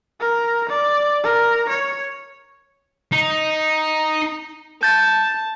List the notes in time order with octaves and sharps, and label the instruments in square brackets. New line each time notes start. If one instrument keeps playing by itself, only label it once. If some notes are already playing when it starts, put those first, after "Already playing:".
[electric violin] A#4
D5
A#4
C#5
[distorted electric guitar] D#4
[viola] A5 [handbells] G6 A6